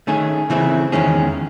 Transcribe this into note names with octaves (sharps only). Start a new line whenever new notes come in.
D#3 A3 C#4 G#4
C#3 E3 C4 E4 G#4
E2 D#3 G#3 C#4 G#4